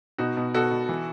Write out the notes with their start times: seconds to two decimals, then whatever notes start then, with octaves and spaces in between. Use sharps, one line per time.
0.18 B2 D#4 F#4
0.37 B2
0.54 B2 F#4 A4
0.71 B2
0.89 E3